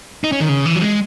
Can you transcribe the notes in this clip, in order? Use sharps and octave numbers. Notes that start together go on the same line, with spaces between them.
D#4
C#4
D#3
C#3
E3
F#3
G#3